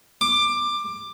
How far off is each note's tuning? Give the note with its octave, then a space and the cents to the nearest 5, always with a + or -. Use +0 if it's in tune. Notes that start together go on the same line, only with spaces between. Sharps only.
D6 +15